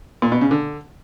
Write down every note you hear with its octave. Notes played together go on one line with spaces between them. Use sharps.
A#2
B2
C#3
D3